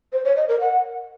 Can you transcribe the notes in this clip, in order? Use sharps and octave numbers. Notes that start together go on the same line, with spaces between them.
C5
C#5
D#5
A#4
F#5